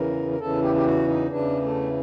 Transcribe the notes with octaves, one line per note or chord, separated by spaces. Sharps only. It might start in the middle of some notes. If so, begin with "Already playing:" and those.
Already playing: E2 C#3 E3 A#4
A#4
E2 C#3 E3 A4
G4
G4
F#4
D#4
E2 C#3 E3 D4
A3